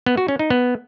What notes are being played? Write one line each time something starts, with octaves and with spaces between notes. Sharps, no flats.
B3
F#4
C#4
D#4
B3